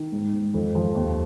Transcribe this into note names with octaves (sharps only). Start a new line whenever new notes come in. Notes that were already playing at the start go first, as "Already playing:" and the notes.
Already playing: D#3
G#2
G#2
F2
F3
D#2